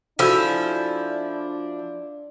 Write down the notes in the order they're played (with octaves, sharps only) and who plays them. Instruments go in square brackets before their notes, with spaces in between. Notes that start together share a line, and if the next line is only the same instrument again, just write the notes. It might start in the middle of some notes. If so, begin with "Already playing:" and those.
[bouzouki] F3 E4 [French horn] D4 [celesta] F#4 A4 [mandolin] G#5 E6